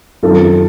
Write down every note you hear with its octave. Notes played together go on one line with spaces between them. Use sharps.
F#2 D#3 F#3 C4 F4 A4